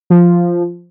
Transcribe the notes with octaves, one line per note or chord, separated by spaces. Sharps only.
F3